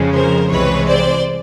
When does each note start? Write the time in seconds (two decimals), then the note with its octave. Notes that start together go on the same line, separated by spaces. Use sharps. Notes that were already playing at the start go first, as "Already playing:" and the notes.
Already playing: F2 C#3 F3 G#3
0.13 A#4 C5
0.49 C2 C3 E3 G#3 B4 C#5
0.86 C5 D5